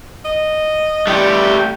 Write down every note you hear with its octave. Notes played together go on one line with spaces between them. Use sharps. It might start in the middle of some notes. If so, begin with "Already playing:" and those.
D#5
G3 A3 E4 G4